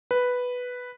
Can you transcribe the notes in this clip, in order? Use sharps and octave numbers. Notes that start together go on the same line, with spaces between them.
B4